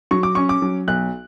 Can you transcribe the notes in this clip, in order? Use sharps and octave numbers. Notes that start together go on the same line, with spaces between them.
F#3 C#6
D6
C#4 C#6
D6
F#3
B1 F#6